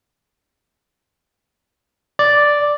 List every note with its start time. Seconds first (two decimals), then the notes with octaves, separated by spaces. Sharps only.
2.19 D5